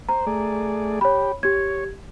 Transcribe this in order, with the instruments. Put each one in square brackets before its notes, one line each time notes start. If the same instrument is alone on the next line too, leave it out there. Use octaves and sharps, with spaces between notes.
[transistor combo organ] C5 [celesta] A#5
[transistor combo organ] A3 G#4 D5
[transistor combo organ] G4 [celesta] C#5 B5
[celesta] G4 G#6 [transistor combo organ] C#5